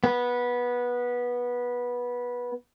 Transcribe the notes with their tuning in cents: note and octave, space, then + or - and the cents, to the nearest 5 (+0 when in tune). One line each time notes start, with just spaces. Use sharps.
B3 -15